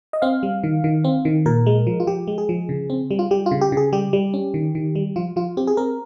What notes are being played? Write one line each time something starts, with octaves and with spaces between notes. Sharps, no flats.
D#5
C4 F5
G3
D#3
D#3
C4
D#3
A#2 A#4
G#3
F3
F4
F3 G4
G#3
G#4
F3
C#3
C4
G3
F4
G3 G4
F4
C#3
G4
C#3 G#4
G3 G4
G3
C#4
D#3
D#3
G3
F3 F4
F3 F4
C4 G4
G#4
C4 A#4